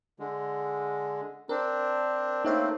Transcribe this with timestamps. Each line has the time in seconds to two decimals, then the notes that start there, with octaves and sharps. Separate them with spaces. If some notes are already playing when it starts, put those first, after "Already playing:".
0.19 D3 G#3
1.49 C4 D4 A#4
2.45 A3 A#3 C4 D#4 C#5 F5